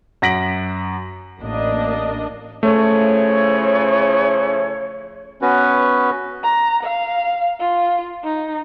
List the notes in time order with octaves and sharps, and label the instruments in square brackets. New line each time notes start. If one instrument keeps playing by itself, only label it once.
[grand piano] F#2 F#5 A#6 B6 D7 F#7
[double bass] A1 [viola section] A#3 D4 D#5
[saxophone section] C#3 F3 E4 [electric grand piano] A3 [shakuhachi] C#5
[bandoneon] B3 C#4 F#4 B4
[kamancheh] A#5
F5
F4
D#4